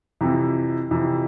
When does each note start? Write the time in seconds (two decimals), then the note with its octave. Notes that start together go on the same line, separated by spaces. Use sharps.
0.21 F2 C3 E3
0.91 F2 C3 E3